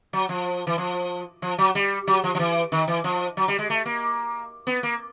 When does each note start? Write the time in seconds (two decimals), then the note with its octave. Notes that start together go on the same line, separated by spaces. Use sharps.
0.13 F#3
0.29 F3
0.67 E3
0.78 F3
1.42 F3
1.58 F#3
1.75 G3
2.07 F#3
2.24 F3
2.35 F3
2.39 E3
2.72 D#3
2.88 E3
3.04 F3
3.37 F#3
3.48 G3
3.59 G#3
3.70 A3
3.86 A#3
4.67 B3
4.83 A#3